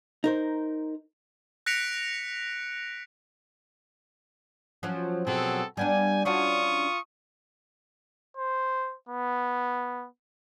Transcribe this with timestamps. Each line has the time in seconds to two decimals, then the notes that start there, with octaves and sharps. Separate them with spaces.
0.24 D#4 A#4 C5
1.66 F#6 A#6 B6 C#7 D7 F7
4.83 F3 F#3 C#4
5.27 B2 F#3 C4 G#4 A4
5.77 G3 B3 D4 G#5
6.25 C#4 D4 F4 F#4 C#6 D#6
8.37 C5
9.09 B3